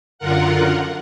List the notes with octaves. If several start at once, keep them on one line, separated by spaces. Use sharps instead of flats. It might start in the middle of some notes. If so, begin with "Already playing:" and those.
F#2 D3 F4 A#4 F#5